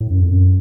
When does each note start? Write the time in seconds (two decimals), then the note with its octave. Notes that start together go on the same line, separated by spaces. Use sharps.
0.01 A2
0.10 F#2
0.20 F2
0.30 F#2